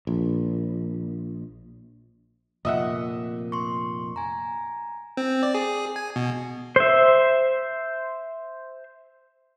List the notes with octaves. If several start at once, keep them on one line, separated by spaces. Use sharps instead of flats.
A#1
F1 A#2 D#5 E5 F#5
C6 C#6
G#5 A#5
C4
D5
G#4
G#5
B2
C5 E5